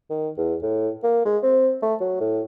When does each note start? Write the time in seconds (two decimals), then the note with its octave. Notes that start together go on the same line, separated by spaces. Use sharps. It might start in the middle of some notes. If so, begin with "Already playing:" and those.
0.10 D#3
0.38 E2
0.62 A2
1.04 A#3
1.25 G#3
1.43 C4
1.82 A3
2.00 F#3
2.20 A2